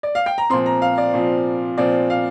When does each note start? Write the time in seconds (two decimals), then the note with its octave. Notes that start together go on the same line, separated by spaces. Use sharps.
0.03 D5
0.15 F5
0.26 G5
0.38 A#5
0.50 A#2 F3 C4 C6
0.66 A#5
0.82 F5
0.98 D5
1.14 A#2 F3 C4
1.77 A#2 F3 C4 D5
2.10 F5